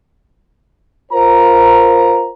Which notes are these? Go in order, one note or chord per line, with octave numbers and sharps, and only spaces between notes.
F4 A#4 C5 A#5